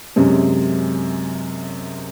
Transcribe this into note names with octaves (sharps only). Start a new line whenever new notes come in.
F#2 C3 G#3 C#4